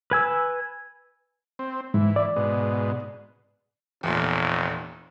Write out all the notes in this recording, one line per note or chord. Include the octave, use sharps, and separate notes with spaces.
B4 G#5 E6
C4
G#2 E3
D5
G#2 B2
F1 E2 A#2